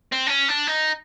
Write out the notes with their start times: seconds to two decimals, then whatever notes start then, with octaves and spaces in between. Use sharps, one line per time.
0.12 C4
0.27 D4
0.30 C#4
0.48 D4
0.67 D#4